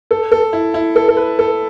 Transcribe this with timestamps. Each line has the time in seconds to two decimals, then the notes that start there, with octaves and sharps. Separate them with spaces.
0.11 A4
0.32 A4
0.53 E4
0.74 E4
0.96 A4
1.08 A4
1.17 B4
1.39 A4